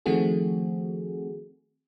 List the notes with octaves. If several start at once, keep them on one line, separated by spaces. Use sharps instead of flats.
D#3 F3 A3 C4 F#4 G#4